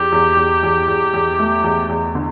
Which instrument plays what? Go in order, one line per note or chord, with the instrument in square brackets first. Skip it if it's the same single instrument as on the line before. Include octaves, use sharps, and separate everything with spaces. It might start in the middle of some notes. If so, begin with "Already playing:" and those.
Already playing: [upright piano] E2 [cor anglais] G4
[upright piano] E2
E2
E2
E2
E2
A3
E2
E2
D3